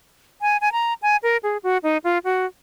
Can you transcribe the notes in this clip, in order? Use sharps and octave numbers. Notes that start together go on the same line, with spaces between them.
G#5
G#5
A#5
G#5
A#4
G#4
F#4
D#4
F4
F#4